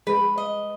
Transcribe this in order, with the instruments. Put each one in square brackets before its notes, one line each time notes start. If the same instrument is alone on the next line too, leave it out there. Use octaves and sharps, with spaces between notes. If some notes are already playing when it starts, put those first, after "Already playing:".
[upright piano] G#3 [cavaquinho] B4
[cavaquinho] D#5